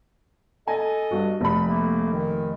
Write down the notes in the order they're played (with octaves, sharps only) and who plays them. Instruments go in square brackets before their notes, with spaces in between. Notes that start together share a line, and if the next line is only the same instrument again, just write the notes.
[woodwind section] A4 D#5 [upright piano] G#5
[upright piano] G2 F#4
F1 B5
[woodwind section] A3 A#3
D#3